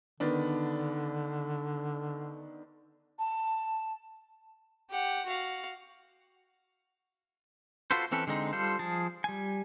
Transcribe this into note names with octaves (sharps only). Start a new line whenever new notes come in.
D3 D#3 B3 D4
A5
G4 F#5
F#4 F5
F4 F#4 A4 B4 C5
E3 C4 C#4 A4 B4
D3 G#3 C4 D#4
G3 F4 A4 C5
F3 G#4 A5
G3 G#5